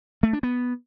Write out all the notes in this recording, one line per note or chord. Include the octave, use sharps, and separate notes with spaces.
A3
D4
B3